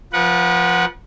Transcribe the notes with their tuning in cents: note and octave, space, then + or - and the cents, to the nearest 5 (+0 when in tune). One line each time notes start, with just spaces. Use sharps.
F3 +0 B4 -35 F#5 +0